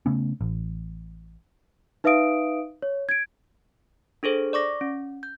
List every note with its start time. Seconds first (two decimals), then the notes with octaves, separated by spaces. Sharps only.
0.06 C#3 A3 B3 C#4
0.41 A1
2.04 D#4 B4 E5 F5 D#6 D7
2.82 C#5
3.09 G#6 D7
4.23 D4 G#4 A4 C5
4.53 D5 C#6 D6 A#6
4.81 C#4
5.23 G6